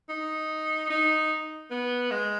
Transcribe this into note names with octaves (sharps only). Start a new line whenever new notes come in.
D#4
D#4
B3
G#3